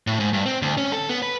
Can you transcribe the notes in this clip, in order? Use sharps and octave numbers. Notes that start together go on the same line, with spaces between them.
A2
G#2
G2
C4
D2
C#4
A4
B3
B4